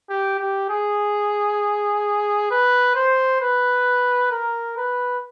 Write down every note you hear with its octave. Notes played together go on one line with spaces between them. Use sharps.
G4
G4
G#4
B4
C5
B4
A#4
B4